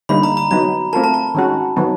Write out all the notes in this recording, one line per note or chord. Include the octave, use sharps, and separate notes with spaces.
D3 G3 A#3 D#4 B5
A#5
A#5
F#3 B3 D#4 A#5
A3 C4 F4 A#4 A5
A5
A5
D#3 G#3 C#4 F#4
D#3 F#3 B3